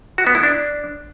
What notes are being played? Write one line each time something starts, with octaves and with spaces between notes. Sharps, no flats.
F#4
B3
E4
D4